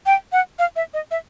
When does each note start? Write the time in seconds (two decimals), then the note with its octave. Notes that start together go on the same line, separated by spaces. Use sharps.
0.06 G5
0.32 F#5
0.59 F5
0.76 E5
0.94 D#5
1.11 E5